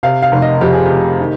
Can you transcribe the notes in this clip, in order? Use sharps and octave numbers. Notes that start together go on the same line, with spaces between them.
C3 F5
F5
F1
D#5
F2 G4
G#4
F1 G4
D#3